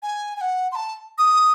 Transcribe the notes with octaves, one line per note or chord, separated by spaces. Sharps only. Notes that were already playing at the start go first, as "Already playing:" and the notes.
G#5
G#5
F#5
C6
A5
D#6